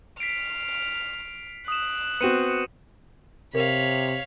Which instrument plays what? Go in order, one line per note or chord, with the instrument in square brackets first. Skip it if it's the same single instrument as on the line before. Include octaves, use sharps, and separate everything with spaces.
[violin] F6 [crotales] B6 C7 D7
[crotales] D#6 E7 [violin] F#6
[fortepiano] B3 C4 F#4 [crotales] C#7 D#7 E7
[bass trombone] C3 [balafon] A#4 [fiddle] C#5 F5 [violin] B5